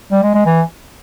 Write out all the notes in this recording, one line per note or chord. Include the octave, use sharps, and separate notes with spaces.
G3
G#3
G#3
E3